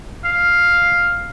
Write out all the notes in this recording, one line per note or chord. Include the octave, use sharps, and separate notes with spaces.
F5